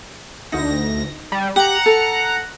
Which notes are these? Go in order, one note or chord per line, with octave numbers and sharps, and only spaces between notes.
D2 D#4 A#6
G3
G4 F#5 A#5
A4